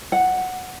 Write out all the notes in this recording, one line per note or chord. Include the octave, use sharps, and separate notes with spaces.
F#5